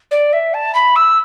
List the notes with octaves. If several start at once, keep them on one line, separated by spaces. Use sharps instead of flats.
D5
E5
A5
B5
E6